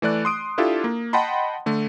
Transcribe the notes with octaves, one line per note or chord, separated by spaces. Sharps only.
E3 A3 D5 F#6
C6 D#6 D7
D4 E4 F4 G4 A4
A#3
D#5 F#5 G5 A5 B5 C6
D3 A3